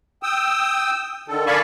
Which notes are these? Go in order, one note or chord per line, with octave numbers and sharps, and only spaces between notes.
G5 D#6 E6
D3 D#3 A4
D5 F5 G#5 A5 B5 C#6